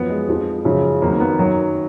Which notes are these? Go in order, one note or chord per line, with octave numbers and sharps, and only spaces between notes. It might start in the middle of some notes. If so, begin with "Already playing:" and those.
Already playing: F#2 F3 B3
G#3
F2 F3
F#2 C#3 F3
F2 D#3 F#3 A#3
A#3
B3
F#2 D#3 F#3